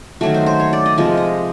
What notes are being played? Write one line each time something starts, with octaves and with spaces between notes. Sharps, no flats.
D#3 F#3 A3 F#4
C5
C5
C#5
D5
D#5
C3 F3 G#3 D#5
D#5